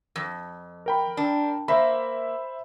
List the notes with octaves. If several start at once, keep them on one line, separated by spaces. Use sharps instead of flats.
F2
A#4 G5 B5
D4
A#3 C5 E5 B5